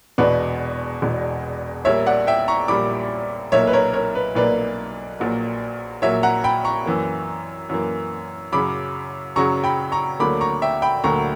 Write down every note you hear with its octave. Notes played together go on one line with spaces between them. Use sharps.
E1 E2 B2 B4 D5
E1 E2 B2
A#1 A#2 G3 A#3 C#5 E5
D5 F#5
E5 G5
A#5 C#6
A#1 A#2 G3 A#3 B5 D6
B1 A#2 A#3 C#5 E5
B4
A#4 C#5
A#4 C#5
B4
B1 A#2 A#3 B4 D5
A#1 A#2 F#3 A#3
A#1 A#2 F#3 A#3 C#5 E5
F#5 A#5
G5 B5
A#5 C#6
F#2 E3 A#3
F#2 E3 A#3
F#2 C#3 F#3 B5 D6
F#2 C#3 F#3 A#5 C#6
G5 B5
A#5 C#6
D2 D3 F#3 A#3 B5 D6
A#5 C#6
E5 G5
G5 B5
D2 D3 F#3 A#3 A#5 C#6